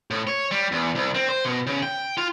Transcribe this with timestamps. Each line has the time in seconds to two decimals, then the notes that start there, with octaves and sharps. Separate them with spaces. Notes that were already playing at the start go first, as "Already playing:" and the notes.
0.11 A2
0.27 C#5
0.51 G3
0.72 E2
0.95 C2
1.15 C4
1.29 C5
1.45 B2
1.67 C#3
1.83 G5
2.18 F4